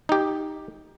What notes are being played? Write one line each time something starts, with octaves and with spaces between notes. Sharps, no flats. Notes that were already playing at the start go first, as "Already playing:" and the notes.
D#4 G4